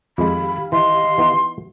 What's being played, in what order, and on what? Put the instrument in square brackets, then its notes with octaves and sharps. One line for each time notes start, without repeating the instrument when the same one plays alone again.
[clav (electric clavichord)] F2 G#3 [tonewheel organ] D#3 G4 F5 [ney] B5
[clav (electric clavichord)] E3 [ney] D#5 [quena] C6
[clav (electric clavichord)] E3 B3 D#4